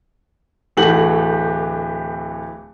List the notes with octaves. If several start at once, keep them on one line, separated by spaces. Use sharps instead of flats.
D1 E3 A3 F#4 G4 F#7